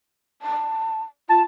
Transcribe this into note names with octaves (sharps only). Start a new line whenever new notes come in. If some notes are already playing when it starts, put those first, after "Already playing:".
A5
F4 A5